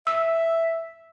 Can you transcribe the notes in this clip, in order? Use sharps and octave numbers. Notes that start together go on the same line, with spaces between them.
E5 E6